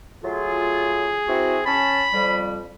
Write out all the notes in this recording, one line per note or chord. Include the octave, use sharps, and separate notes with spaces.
F#3 A3 F4 G#4
C4 E4 F#4
C#4 A5 B5
F2 G3